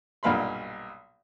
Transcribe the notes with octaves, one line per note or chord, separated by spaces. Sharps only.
B1 G2 A#2 F5 B5 C6